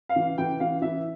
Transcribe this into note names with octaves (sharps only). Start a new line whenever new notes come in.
F5
E3
E3 G5
E3 F5
E3 E5